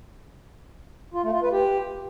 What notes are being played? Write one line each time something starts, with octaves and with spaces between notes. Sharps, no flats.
F4
A3
F4
B4
G4